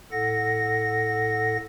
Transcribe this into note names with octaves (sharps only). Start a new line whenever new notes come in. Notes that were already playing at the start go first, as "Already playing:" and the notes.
A2 A4 F#5 A#6